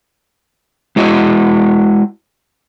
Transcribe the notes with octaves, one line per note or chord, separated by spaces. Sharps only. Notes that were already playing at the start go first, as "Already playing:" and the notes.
G#3 E4 F#4 D#5